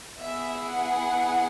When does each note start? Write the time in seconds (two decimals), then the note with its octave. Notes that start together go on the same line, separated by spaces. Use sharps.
0.20 B3 E4 G#4 E5
0.70 F#5